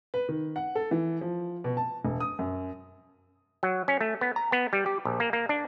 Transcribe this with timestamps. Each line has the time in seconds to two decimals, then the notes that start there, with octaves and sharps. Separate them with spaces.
0.14 B4
0.29 D#3
0.56 F#5
0.75 A4
0.91 E3
1.21 F3
1.64 B2
1.77 A5
2.05 E1
2.20 D#6
2.39 F#2
3.63 F#3
3.88 C#4
4.01 A3
4.21 B3
4.36 A#5
4.52 B3
4.73 G3
4.86 G4
5.05 A#1
5.20 A#3
5.33 A#3
5.49 D4